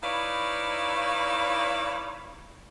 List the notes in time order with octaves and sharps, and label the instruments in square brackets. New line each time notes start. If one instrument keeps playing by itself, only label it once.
[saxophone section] D#4 E4 B4 C#5 D5 F5